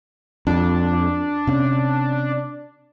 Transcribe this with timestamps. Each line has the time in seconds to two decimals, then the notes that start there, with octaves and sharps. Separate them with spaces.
0.47 F2 D4
1.47 C3 C#4